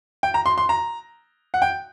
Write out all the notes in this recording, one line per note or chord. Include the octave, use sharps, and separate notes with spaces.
G5
A#5
C6
C6
A#5
F#5
G5